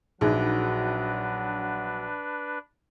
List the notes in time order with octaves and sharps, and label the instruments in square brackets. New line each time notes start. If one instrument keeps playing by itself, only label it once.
[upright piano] A#1 [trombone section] F#3 F#4 [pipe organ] D4 B4 [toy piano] D#4 G#4